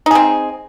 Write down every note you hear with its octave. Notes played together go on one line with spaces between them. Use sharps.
C4 D#4 G#4